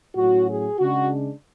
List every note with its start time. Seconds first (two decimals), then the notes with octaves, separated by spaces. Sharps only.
0.16 A2 F#3 C#4 F#4
0.48 G#4
0.80 C#3 G#3 D4 F#4